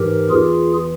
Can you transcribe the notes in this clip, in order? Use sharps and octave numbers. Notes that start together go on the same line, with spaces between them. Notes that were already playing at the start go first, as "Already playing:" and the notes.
Already playing: G#2 E3 G4 A#4
E2 E3 F4 G#4